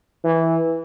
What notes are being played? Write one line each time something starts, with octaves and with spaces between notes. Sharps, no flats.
E3